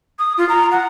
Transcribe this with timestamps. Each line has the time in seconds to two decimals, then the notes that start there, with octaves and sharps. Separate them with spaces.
0.19 D#6
0.38 F4
0.49 A#5
0.72 F#5